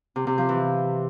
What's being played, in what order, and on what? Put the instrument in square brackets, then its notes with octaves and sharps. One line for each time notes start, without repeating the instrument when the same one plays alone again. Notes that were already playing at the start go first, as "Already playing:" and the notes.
[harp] C3
C3
F3
E3